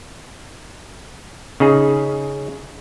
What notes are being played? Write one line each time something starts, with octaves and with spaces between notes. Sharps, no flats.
C#3 D#4 G#4